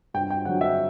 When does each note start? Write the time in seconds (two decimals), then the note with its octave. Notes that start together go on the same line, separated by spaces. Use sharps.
0.14 G2 G5
0.31 G5
0.45 D3 F#3 F#5
0.61 E5